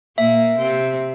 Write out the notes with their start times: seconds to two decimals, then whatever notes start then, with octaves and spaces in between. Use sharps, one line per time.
0.18 A#2 A#3 E5
0.58 C3 C4